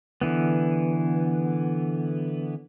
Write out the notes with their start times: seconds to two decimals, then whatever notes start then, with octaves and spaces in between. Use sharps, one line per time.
0.21 D3 E3 B3